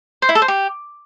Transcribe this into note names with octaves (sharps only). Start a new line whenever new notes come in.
C5
E4
A4
C5
G4